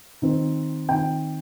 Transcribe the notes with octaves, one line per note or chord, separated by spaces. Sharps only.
D#3 C4
D#3 C4 G5